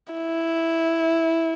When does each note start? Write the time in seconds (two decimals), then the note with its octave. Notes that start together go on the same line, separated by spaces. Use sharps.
0.13 E4